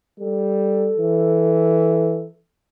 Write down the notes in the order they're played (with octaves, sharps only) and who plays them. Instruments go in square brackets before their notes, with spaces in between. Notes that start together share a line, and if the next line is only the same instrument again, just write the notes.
[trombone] G3 [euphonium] A4
[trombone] E3